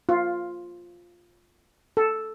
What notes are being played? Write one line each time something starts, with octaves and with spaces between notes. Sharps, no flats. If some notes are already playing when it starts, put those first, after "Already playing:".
F4
A4